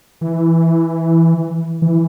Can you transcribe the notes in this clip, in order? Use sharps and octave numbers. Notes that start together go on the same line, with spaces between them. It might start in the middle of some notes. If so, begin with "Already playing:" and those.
E3
E3